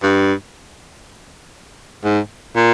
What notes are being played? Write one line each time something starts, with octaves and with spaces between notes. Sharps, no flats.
G2
G#2
A#2